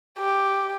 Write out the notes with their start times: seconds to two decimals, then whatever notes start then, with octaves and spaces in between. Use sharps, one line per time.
0.18 G4